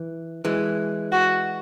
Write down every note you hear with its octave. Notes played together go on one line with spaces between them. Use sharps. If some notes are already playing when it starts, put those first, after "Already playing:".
Already playing: E3
E3 G#3
F#4